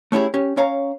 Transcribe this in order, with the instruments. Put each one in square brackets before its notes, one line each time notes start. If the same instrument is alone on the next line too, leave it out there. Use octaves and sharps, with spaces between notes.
[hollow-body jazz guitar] A3 C#4 E4 G4 G#4
C#4 G4
C#4 C#5 F5 A#5